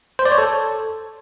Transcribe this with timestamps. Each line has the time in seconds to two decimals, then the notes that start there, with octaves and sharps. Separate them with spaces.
0.19 C5
0.25 D5
0.32 C#5
0.38 A4